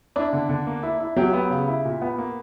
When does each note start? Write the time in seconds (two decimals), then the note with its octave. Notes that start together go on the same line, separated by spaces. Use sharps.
0.16 D4 E4 D5
0.33 D3
0.49 D3
0.67 A#3
0.83 E4
1.00 E4
1.16 F#3 G4 G5
1.33 B3
1.50 C#3
1.68 E4
1.85 A#2
2.02 B3
2.18 A#3